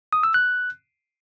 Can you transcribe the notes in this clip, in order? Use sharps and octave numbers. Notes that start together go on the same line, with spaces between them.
D#6
E6
F#6